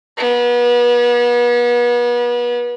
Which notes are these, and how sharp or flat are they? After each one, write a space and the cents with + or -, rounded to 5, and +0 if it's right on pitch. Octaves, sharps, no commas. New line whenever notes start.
B3 -35